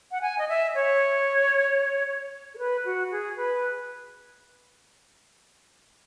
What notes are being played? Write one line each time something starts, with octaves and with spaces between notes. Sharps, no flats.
F#5
G#5
D#5
E5
C#5
A4
B4
F#4
G#4
B4